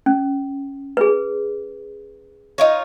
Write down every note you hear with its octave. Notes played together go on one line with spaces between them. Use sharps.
C#4
G#4 B4
D#4 F4 C#5